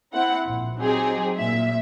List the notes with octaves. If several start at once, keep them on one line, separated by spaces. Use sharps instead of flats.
C4 E4 F#5
A#1
F#3 C4 D#4 G4 G#4
A#2 E5